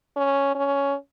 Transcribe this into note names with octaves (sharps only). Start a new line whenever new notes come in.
C#4
C#4